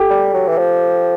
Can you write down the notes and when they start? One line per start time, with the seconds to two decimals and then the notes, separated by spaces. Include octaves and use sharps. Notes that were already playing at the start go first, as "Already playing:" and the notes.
Already playing: G4 A4
0.10 G3
0.34 F#3
0.48 E3
0.58 F3